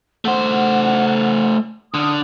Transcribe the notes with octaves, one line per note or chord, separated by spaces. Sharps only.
A3 C5 F#5
D3 D#6 F6